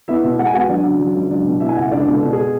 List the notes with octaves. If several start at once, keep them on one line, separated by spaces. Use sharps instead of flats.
B3 E4 E5
B2
G#3 F#5
G#5
B3 F#4 F#5
F#3 D4 D5
C#3
F#3
C#2
F#3 D4 D5
B2
B2 E4 E5
G#5
C#2 F#5
E5
C#2 D4 D5
B2
A4
B2
G#4